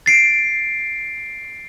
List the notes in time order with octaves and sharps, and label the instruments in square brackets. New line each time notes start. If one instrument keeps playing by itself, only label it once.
[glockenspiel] A6 C7 D7